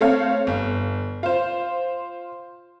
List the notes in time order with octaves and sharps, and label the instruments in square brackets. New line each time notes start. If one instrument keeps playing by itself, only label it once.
[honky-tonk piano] A3 C4 A4 C#5 F5
G1
F4 C5